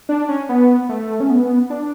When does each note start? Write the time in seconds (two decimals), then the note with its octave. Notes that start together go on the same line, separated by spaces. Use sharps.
0.09 D4
0.28 C#4
0.49 B3
0.89 A3
1.20 C#4
1.30 B3
1.70 D4